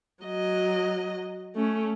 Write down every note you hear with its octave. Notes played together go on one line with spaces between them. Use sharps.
F#3 D#5
A3 C#4